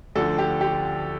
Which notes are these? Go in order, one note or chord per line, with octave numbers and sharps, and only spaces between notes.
D2 D3 F3 A4
G4
G4